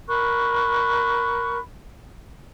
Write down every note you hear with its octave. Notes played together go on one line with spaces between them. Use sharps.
A#4 B5 C#6 F#6